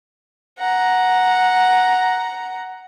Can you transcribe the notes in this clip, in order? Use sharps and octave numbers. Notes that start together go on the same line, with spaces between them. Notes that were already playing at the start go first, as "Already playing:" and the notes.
F#5 A#5